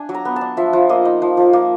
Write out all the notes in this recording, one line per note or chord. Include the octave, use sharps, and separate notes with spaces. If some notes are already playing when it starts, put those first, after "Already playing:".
Already playing: D4 G#5
F#3
A#5
B3
A5
D4
F3 E5
F3
A#3 D#5
D#4
F3
F3
A#3